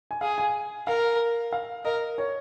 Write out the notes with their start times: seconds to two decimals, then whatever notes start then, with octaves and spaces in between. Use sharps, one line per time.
0.11 G#5
0.21 G#4 F5
0.38 G#5
0.87 A#4 F5
1.53 F5
1.85 A#4 D#5
2.18 C#5